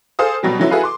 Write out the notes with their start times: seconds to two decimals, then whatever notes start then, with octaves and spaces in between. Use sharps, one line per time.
0.19 G#4 A4 C5 F5 D#6
0.43 B2 F#3 G3 G4
0.59 D3 E3 F#3 C#4 E4
0.71 E4 F#4 G#4 A4 B4 F5
0.83 C6 D6